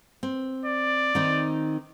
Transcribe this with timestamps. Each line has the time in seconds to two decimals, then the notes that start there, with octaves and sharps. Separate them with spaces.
0.23 C4
0.65 D5
1.15 D#3 C4 D#4